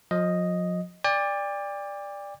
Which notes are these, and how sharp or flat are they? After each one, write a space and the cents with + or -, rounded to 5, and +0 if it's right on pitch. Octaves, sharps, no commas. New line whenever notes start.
F3 +40 D#5 +0
D5 +0 G5 +40